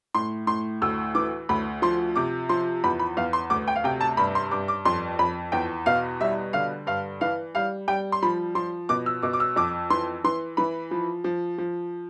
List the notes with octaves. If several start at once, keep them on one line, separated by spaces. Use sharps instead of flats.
A2 C6
A2 C6
D2 E6
E3 D6
D2 B5
F3 C6
C3 D6
F3 C6
E2 B5
B5
E2 F5
C6
D2 D6
G5
F5
C3 G5
A5
G2 B5
C6
G2 D6
D6
F2 C6
F2 B5
E2 G5
B2 F5
G3 E5
D3 F5
G2 F5
E3 F5
G3 F5
G3 G5
C6
F3 B5
F3 C6
B2 D6
E6
B2 D6
D6
E6
F2 D6
E3 C6
E3 C6
E3 B5
F3
F3
F3